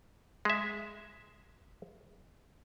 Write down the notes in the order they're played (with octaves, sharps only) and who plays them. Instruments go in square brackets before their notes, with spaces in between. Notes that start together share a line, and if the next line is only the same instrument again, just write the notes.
[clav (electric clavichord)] G#3 E5